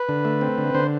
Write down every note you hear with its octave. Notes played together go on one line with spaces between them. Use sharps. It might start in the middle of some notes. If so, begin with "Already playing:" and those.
Already playing: B4
D3
A3
C4
D3
D3 C5